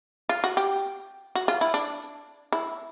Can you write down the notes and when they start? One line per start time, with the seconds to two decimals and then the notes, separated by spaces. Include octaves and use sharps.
0.29 F4
0.44 F#4
0.57 G4
1.35 F#4
1.48 F4
1.61 E4
1.74 D4
2.52 E4